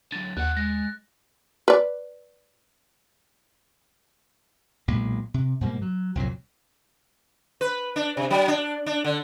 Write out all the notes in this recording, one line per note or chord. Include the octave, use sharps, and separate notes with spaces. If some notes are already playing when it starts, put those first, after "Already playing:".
D3 F#3 A6
D#2 G3 F#5 F#6
G#3 A#6
B4 D5
B1 A#2 G#3
C3
G#2 B2 G3 A#3
F#3
C2 F2 A#2 F#3
B4
D4
C3
F#3
D4
D4
D3